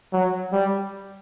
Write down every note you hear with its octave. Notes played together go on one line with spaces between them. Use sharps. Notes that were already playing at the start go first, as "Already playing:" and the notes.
F#3
G3